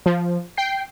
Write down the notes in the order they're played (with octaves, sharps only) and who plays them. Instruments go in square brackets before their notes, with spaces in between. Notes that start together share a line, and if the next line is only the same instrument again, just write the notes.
[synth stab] F3
G5 C7